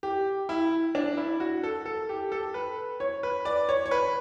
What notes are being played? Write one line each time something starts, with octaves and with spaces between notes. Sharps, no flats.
G4
E4
D4
E4
F#4
A4
A4
G4
A4
B4
C#5
B4
D5
C#5
C#5
B4